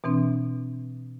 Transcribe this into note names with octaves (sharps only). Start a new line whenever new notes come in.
B2 E3 C4 D4